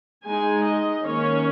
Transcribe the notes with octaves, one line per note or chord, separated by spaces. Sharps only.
G#3 D#4 G#5
D#5
D#3 A#3 C#4 C#5